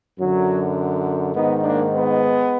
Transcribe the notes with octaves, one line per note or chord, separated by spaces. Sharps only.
F#2 D3 F#3
G#2 D#3 B3 D#4
A#3 D4
G#3 B3